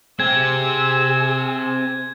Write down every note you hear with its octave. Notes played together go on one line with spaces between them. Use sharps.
C4 G4 G#4 E6 G#6